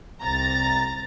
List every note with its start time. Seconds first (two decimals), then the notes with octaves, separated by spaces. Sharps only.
0.23 C2 C3 A#5 A6